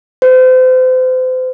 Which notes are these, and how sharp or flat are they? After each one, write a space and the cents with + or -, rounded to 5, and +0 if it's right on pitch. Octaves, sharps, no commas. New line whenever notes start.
C5 -35